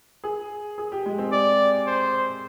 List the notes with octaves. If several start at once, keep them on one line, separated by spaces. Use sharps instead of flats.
G#4
G#4
G4
G#3
C4
D5
C5